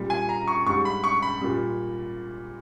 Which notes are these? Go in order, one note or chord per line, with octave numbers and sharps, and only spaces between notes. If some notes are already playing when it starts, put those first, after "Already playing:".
Already playing: A#2 G3
G#5
A#5
C#6
G#2 G3 C#6
B5
C#6
B5
A#2 G3